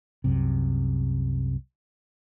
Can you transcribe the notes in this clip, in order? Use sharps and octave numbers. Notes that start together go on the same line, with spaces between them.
C2 F#2 C3